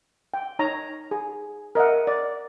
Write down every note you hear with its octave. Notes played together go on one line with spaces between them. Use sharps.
G5
D#4 C#5 A#5
G#4
A#4 D#5 E5 F#5
D5